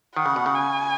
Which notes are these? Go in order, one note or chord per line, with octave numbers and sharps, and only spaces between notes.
D#3 F#5
C#3
B2
C#3
G#5